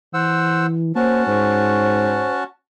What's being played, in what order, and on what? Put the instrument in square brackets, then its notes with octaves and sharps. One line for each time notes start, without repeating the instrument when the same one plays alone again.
[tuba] E3 [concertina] C5 F#5 E6
[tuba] A#3 [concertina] C#4 F#4 A5 [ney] C5
[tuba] G#2 [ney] C5